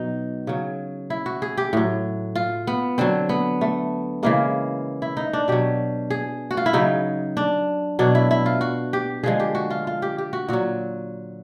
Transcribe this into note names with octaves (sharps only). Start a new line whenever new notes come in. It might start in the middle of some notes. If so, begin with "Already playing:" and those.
Already playing: B2 F#3 D#4
C#3 F#3
E4
F#4
G#4
G4
A2 F#3
F4
B3
D3 F#3 C4
B3
A3
C#3 E3 G#3 A#3
E4
D#4
D4
B2 F#3 G4
G#4
F#4
F4
E4
C#3 F#3 D#4
D4
B2 F#3 D4
E4
E4
F4
F#4
G4
D3 F3 G#3 G#4
G4
F#4
F4
F4
G4
G4
F#4
A#2 F#3 F#4